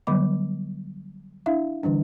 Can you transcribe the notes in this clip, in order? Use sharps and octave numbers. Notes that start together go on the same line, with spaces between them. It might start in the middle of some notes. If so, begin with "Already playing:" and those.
D3 F#3 G3 B3 B5 D6
D4 E4 E5 F5
D3 E3 G3 D4